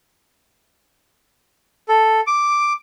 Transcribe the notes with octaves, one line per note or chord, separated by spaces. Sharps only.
A4
D6